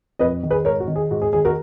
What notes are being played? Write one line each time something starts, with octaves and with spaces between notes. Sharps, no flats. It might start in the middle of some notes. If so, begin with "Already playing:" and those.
F2 B4 D#5
D#3
G#4 B4
G#2 A#4 C#5
F#4
D#3
G#4
G#2 F#4
G#4
D#3 G#4
F#4 A#4